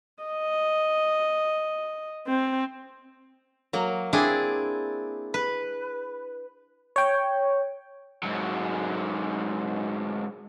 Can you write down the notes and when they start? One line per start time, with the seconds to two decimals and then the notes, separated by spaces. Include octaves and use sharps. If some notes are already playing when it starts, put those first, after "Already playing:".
0.24 D#5
2.27 C4
3.73 F#3 A#3
4.13 C4 D4 E4 G#4 D5
5.34 B4
6.96 C#5 G5
8.23 G#2 F#3